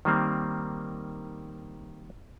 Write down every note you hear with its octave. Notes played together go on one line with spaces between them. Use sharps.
D#3 G3 A#3 C4